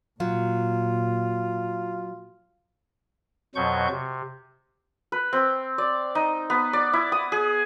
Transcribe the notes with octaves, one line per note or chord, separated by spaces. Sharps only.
A#2 F#3 F4
F2 B2 F#3 C#6 G6
C3
B4
C4
D5
D#4
B3
D5
E4
D#6
G#4